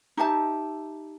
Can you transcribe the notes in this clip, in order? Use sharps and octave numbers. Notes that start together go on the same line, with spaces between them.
D#4 G4 E5 A5